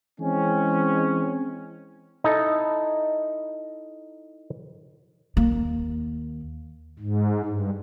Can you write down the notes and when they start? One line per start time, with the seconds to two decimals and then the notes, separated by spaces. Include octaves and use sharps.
0.21 E3 G#3 C4 C#4
2.24 D#4 E4 A4
5.37 D#2 A#3
6.99 G#2
7.46 G2